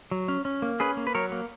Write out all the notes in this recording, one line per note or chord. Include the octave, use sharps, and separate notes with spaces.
F#3
C#4
C#4
A#3
C#4 G#4 B4
A#3
B4
F#3 A#4 C#5
A#3